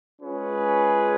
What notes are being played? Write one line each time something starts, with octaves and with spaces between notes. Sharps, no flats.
G#3 C#4 F4 G#4 B4